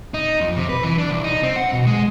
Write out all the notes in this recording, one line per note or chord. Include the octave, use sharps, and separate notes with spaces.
D#4
F2
C3
B4
E3
D4
C2
D#4
C4
F#5
B2
G#3